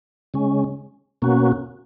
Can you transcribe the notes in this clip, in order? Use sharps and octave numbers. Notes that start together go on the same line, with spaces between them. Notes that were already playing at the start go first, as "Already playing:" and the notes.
C#3 G#3 C#4
B2 A#3 C#4 F#4